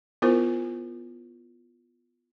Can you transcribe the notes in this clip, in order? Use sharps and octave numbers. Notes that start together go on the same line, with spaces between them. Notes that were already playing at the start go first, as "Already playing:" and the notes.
B3 E4 F4 A#4 C5